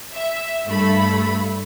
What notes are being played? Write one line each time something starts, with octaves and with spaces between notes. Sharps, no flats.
E5
G2 A3 B5